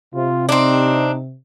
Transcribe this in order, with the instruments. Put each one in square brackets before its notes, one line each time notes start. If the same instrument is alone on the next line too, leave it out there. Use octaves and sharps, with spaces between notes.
[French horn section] C3 [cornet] F4
[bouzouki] C4 D4 [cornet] D#4